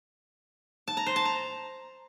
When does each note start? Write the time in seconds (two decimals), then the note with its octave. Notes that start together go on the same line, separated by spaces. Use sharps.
0.88 A5
0.97 A#5
1.06 C5
1.16 A5
1.25 A#5